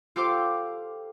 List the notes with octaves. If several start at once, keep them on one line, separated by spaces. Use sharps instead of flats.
F4 G4 A4 C5 C6 D6